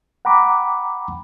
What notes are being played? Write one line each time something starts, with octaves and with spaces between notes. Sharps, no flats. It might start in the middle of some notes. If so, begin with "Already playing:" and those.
F#5 G5 A#5 B5 D6